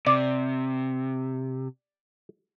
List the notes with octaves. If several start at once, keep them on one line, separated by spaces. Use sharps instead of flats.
C3 D5